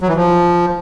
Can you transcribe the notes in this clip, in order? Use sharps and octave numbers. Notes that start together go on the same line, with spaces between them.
F#3
E3
F3